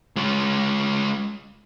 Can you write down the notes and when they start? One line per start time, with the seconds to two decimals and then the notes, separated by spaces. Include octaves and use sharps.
0.16 G#3 F4